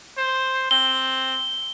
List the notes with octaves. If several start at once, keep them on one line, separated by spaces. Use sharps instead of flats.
C5
C4 G7